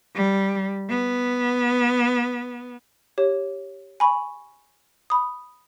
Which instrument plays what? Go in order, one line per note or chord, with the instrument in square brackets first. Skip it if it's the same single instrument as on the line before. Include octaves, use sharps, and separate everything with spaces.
[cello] G3
B3
[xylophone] G4 C#5
G#5 B5 C#6
B5 D#6